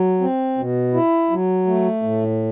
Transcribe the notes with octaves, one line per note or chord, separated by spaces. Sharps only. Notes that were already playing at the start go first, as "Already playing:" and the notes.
Already playing: F#3
C4
B2
E4
F#3
A3
A2